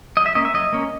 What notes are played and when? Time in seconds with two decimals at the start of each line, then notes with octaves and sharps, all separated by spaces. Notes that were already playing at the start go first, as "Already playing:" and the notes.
0.17 F#3 D#5
0.26 E5
0.35 A#3 C#4 D#5
0.45 E5
0.54 F#3 D#5
0.73 A#3 C#4